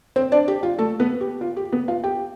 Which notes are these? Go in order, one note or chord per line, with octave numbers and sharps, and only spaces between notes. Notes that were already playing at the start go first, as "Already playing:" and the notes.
C4 C5
D4 D5
G4
F4
A3 A4
B3 B4
G4
F4
G4
B3 B4
F4 F5
G4 G5